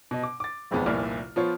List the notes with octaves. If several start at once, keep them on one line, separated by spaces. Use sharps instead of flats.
B2 D#5
D6
D6 A6
F#1 B1 F2 G#3 B3 A5
F1 C2 A#2 E4 D5 F6
F3 B3 F4 C5 C#5